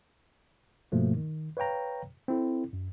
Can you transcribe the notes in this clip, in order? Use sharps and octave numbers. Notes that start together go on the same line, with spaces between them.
G2 B2 F3 A3 A#3
D#3
B4 C#5 F5 G5 A#5
C4 E4 A4
F#2